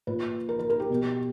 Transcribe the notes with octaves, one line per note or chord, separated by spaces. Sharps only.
A#2 B4
A#4
A#4
A#4
G4
B2